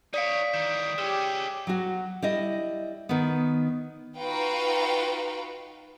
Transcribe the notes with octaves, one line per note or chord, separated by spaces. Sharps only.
D#4 C#5 D5 F5 D#6 B6 D7
D#3 E3 G6 E7
G#3 C#4 G4 E6 E7
F#3 F#4
G3 E4 D#5
D#3 B3
D#4 F4 F#4 B4 F5 G5